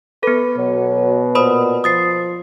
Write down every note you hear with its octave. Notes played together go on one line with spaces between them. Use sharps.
B3 A4 B4
B2 F#3
A#2 C5 B5 D#6
F3 D#6 A6 C7